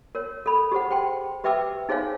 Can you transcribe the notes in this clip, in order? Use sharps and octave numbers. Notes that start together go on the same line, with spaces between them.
A#4 C#5
A4 B5
G4 G#4 C5 F#5
C5 G5 C6
G4 B4 E5 G5 D6 E6
D#4 G#4 C5 C#5 F5 G#5